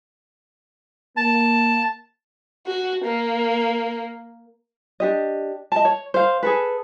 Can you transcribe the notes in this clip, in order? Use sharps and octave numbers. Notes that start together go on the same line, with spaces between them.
A#3 A5
F#4
A#3
D4 G4 D#5
D#5 A5
C#5
C5 F5
G#4 A4 B4